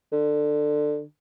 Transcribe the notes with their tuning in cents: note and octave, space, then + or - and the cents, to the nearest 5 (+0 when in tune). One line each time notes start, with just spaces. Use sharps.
D3 +20